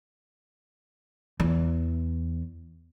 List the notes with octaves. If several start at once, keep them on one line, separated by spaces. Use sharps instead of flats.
E2